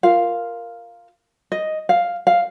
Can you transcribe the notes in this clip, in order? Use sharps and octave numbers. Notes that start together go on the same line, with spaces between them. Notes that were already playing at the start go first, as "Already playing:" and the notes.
F4 A#4 F5
D#5
F5
F5